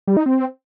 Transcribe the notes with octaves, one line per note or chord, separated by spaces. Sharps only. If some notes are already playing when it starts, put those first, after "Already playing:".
G3
D#4
C4